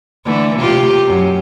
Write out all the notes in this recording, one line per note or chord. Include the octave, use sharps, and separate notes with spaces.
D3 E3 A3
C3 F4 G4
F#2